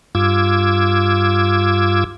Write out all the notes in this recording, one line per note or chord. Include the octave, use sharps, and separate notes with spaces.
G2 F4 D6 E6 G#6